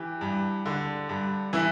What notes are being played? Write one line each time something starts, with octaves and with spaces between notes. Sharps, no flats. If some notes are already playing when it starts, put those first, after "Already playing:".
Already playing: E3 G4
G2
D3
G2
E3 E4